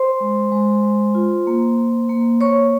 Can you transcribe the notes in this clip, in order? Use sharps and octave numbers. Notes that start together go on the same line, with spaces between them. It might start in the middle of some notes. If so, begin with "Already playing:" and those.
Already playing: C5 C6
G#3
G#3
G#3
F4
A#3
A#3
A#3
A#3 C#5 C#6